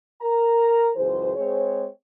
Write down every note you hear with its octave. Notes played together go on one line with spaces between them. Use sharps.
A#4 A#5
C#2 F#2 E3 G#4 C5
G#3 C4 G#4 C5 C#5